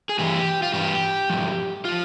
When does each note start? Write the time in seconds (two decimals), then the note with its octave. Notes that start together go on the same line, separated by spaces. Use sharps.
0.09 G#4
0.19 G2 E3 G4
0.62 F4
0.74 G2 E3 G4
1.30 G2 F3
1.85 F3 F4